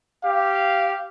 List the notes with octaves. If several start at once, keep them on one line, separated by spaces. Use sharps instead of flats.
G4 F5